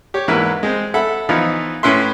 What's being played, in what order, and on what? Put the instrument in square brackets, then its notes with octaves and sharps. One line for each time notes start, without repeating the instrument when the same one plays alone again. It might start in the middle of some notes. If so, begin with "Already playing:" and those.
[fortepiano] G4 C#5
E2 G#2 A#3 E4 B4
G#3 C4
A4 E5 F#5 B5
E3 F3 B3 D#4 F4
A2 C#4 E4 B4 E5 C6